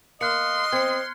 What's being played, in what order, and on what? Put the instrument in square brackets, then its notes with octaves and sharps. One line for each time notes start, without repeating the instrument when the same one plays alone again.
[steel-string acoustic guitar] A#3 [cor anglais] D#5 [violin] C6 [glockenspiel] F6 F#6 C#7
[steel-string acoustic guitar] C4 [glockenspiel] G#6 C#7